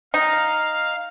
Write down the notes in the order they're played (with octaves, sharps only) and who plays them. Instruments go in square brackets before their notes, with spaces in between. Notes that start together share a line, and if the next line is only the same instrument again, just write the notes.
[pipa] D#4 [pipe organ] F5